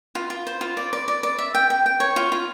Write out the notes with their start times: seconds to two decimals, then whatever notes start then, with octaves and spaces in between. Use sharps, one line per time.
0.15 F4
0.30 F4
0.47 C5
0.61 F4
0.77 D5
0.93 D5
1.08 D5
1.23 D5
1.39 E5
1.55 G5
1.70 G5
1.86 G5
2.00 C#5
2.16 F4
2.32 F4